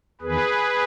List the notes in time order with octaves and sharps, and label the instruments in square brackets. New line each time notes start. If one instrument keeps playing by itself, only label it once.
[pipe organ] E2 D#3 G#4 B4